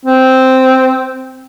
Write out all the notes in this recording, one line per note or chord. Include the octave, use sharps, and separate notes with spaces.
C4